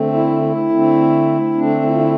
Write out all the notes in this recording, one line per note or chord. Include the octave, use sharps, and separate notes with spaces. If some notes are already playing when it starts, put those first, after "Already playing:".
Already playing: D3 A3 C4
E4
E4
D3 A3 C4
D3 A3 C4 D4
E4
F4
E4